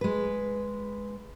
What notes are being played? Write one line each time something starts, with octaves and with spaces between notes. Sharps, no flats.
G#3 B4